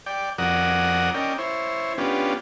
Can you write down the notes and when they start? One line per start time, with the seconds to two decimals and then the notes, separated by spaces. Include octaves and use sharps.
0.06 D5 G5
0.38 F2 F#4 A#4 D5 F#5 D#6
1.14 C#4 A#4 D5 D#5 G5
1.38 E4 C5 C#5
1.98 B3 C#4 D4 F4 G4